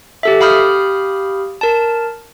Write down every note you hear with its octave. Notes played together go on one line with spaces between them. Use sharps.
G4 A4 E5
G4 F5 B5 D#6 F6 G6
A#4 A5